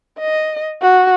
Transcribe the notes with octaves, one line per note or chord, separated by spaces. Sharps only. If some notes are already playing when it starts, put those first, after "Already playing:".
D#5
F#4